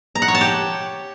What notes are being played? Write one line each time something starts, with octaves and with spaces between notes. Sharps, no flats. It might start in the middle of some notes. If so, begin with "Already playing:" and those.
A#5
F#5
C#5
A5
G4